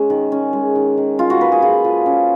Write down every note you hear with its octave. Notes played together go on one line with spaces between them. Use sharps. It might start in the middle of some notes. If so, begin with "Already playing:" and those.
Already playing: G#3 C#4
D#3
C#4
G#3
D#3
D#3
C#4 F4
F#4
A#3 B4
G#4
F3 F4
F3
C#4